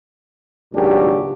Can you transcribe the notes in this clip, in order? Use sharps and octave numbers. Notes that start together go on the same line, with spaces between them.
G#1 C#2 A#2 F#3 D4 G4